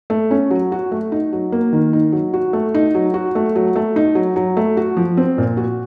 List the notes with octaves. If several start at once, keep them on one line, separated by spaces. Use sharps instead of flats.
A3
C#4
F#3
F#4
A3
D#4
F#3
A#3
D#3
D#4
F#3
F#4
A3
D#4
F#3
F#4
A3
F#3
A3
D#4
F#3
F#3
A3
F#4
F3
C4
A#2
F#4